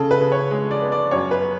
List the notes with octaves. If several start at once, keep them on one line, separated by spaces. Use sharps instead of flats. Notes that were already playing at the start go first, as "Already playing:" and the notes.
Already playing: C#3 A4
B4
C#3
C#5
G#3
D5
B3
D5
F#2 C#5
B4